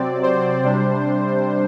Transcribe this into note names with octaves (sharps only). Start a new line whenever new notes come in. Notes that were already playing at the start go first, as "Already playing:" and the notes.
Already playing: C3 F#3 C4 D5
C5
C3 G3 D4